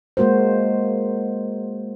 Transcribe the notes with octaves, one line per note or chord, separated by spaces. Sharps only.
G#3 A#3 F#4 A#4 C5